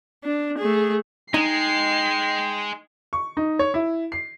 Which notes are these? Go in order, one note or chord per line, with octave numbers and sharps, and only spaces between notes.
D4
A3 G#4
G#3 D#4 G5 C7
C#6
D#4
C#5
E4
C7